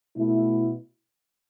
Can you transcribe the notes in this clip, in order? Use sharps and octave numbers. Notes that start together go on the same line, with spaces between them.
B2 A3 E4